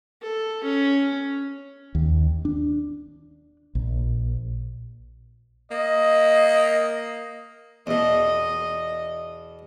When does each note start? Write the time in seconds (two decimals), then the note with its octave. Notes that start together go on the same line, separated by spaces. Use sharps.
0.22 A4
0.64 C#4
1.95 D#2
2.45 D4
3.75 A#1
5.71 A#3 D#5
7.87 E2 B2 D#5